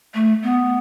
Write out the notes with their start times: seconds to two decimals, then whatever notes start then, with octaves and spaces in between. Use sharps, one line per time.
0.14 A3
0.43 B3